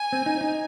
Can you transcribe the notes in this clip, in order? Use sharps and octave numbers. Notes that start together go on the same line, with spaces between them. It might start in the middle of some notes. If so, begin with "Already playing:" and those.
Already playing: G#5
C4
D#4
D#4